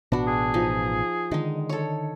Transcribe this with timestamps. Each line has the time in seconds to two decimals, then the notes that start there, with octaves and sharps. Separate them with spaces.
0.12 A1 B2 B3 D4 F#4
0.28 G#4
0.54 F3 D#4
1.31 D3 D#3 G#3 D#4
1.69 A4 C#5